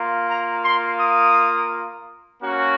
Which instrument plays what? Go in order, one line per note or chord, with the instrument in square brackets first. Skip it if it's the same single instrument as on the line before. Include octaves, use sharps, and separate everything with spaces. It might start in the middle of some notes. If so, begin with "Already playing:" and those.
Already playing: [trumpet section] A#3 F4
A#5
C6
D#6
A#3 C#4 F#4